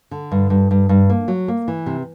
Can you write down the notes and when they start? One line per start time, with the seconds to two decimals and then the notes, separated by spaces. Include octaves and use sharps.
0.11 D3
0.32 G2
0.50 G2
0.71 G2
0.89 G2
1.10 A#3
1.28 F#3
1.48 A#3
1.68 E3
1.86 C3